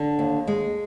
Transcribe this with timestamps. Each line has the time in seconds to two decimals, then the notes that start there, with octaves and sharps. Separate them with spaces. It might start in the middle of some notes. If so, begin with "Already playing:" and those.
Already playing: D3
0.19 D#2
0.47 G#3